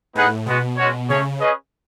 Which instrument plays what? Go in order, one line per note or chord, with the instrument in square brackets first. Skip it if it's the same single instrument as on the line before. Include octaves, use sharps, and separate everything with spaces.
[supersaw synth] A2 [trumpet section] B3 D#4 G#4 B4 F#5
[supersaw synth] B2 [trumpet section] G#3 B3 F#4
[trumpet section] G#3 C#4 F#4 C#5
[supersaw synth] C#3 [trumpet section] A3 C#4 G#4 C#5
[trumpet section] C#4 G#4 B4 D#5